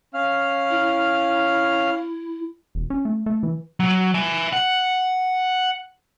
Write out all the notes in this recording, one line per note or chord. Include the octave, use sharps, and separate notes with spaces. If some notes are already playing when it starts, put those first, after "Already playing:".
C#4 F5 F6
E4
E1
C#4
A3
A3
E3
F#3
E5 G#5
F#5